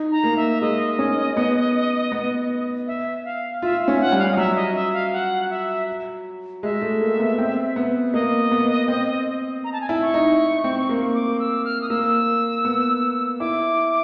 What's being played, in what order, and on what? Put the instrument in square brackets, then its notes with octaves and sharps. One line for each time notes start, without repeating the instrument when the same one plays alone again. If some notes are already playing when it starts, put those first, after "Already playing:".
Already playing: [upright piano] D#4
[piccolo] A#5
[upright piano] A#3
[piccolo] E5
[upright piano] G#3 [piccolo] D#5
[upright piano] C#4
B3
B3
[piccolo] E5
F5
[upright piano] F4 [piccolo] E5
[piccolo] E5
[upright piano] C#4
[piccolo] F#5
[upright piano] G3
[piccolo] F5
D#5
[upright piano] F#3 [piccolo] E5
[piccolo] D#5
E5
F5
F#5
E5
[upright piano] G#3 [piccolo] E5
[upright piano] A3
A#3
B3
C4
B3
[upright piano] A#3 [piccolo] D#5
[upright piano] B3
C4
[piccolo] A#5
A5
G#5
[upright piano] E4 [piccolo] A5
[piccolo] C#6
[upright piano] D#4
C4
A#3
[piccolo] D6
E6
F6
D#6
[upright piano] A#3 [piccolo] E6
[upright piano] B3
[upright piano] E4 [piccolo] D6